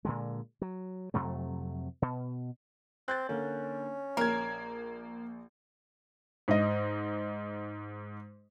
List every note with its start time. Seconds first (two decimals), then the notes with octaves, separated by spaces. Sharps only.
0.05 A#2 D3 G#3
0.62 F#3
1.14 F2 C3 F#3 A3
2.02 B2
3.08 C4 F#6 G6 A6
3.29 D3 A#3 C#4
4.17 A#1 A#3 A#4 G#6
6.48 G#2 D#5